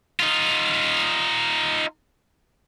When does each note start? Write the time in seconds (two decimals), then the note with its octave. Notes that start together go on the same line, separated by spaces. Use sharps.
0.20 D#4 F4